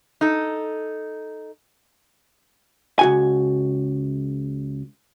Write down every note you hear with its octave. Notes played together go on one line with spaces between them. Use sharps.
D#4 A4
C#2 F#4 G#5